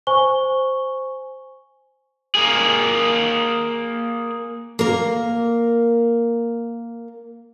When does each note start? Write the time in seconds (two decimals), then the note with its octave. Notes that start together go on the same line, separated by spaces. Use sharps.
0.07 C5 G#5 C#6 G7
2.35 A#3 G#4
4.79 A#3 A#4